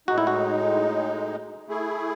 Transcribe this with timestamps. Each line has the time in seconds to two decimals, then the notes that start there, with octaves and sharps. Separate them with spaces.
0.08 A2 G#3 D#4 F#4
0.18 E4
0.27 F#4
1.68 A3 E4 G#4